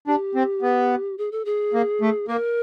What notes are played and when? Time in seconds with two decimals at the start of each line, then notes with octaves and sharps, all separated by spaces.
0.07 D4 G4
0.35 C4
0.62 B3
1.18 G#4
1.32 A4
1.45 G#4
1.74 A#3
2.01 A3
2.28 A#3 A#4